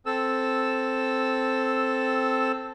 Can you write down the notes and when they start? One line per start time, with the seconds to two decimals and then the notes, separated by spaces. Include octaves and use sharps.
0.06 C4 A4 E6